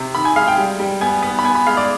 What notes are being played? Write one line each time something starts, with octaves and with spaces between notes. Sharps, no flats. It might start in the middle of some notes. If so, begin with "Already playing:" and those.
Already playing: C3
D#3 B5
G#5
G#3 F5
G5
G3
G3
B3 G#5
B3
B5
B3 G#5
B5
G#3 F5
D5